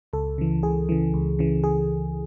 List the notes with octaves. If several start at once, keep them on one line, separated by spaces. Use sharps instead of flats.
C#2 A4
C#3 E3
C#2 G#4
C#3 E3
C#2
C#3 E3
G#4